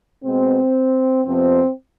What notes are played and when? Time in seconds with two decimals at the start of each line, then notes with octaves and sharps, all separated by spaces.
0.24 B2 G#3 B3 C4
1.26 F2 C3 F3 B3 C4